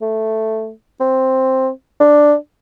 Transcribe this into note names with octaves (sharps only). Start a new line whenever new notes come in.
A3
C4
D4